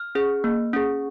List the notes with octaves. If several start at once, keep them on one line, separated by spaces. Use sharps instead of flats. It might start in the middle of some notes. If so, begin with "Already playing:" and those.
Already playing: F6
C#4 G#4
A#3
C#4 G#4